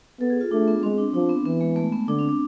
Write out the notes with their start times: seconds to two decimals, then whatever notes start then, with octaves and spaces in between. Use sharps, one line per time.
0.20 B3 A4
0.30 G#4
0.41 F4
0.51 A3 D4
0.68 B3
0.83 G#3 C4
0.98 D4
1.14 F3 D4
1.29 B3
1.45 E3 B3
1.61 G#3
1.76 A3
1.93 B3
2.08 D3 D4
2.19 C4
2.29 D4